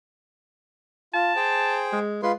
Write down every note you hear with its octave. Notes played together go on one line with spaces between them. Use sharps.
F4 A5
G#4 C5 G5
G#3
G#3 F4 B4 C6